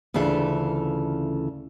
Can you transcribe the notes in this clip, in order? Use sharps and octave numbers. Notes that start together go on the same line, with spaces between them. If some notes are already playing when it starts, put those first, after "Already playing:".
D2 C#3 E3 F4 A4 E5